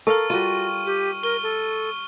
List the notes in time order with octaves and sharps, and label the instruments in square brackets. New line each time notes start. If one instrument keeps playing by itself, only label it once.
[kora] A4 A#4 F5 [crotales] C#6 F6
[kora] G3 F4 [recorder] F#4 [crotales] D#7
[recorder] G4
[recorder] A#4 [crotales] C#6 G7
[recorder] A4